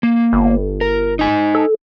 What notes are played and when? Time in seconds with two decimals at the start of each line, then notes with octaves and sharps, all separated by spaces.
0.03 A#3
0.33 G1
0.81 A#4
1.19 D#4 G#5
1.55 A4